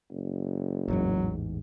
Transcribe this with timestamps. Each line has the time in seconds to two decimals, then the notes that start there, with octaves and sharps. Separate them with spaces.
0.11 F#1
0.88 A1 E2 G#2 F#3